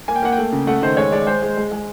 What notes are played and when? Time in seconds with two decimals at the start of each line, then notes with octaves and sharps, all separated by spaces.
0.08 A#3 G#5
0.16 G5
0.23 A#3 F#5
0.32 G5
0.38 A3
0.52 C#3
0.67 A3 F#5
0.82 D#3 C5
0.97 G#3 C#5
1.12 G#3 D5
1.27 G#3 C5
1.43 G#3
1.57 G#3
1.72 G#3